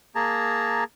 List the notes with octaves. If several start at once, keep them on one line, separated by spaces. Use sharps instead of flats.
A#3 G#4 A5 A#5